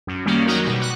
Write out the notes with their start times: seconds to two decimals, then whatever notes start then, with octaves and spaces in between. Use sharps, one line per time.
0.07 F#2
0.26 D#3 G3 A#3 C#4
0.46 F#3 D#4 F#4 A#4
0.65 B2 G3
0.80 F#4 F#6